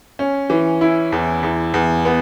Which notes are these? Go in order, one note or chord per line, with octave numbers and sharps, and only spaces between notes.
C#4
E3
E4
E2
E2
E2
B3